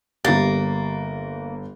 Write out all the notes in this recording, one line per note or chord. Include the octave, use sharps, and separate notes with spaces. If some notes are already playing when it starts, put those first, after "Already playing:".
G1 A#3 G4 A4 A6